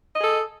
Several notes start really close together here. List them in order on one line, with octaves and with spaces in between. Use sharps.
D#5 G#4 A4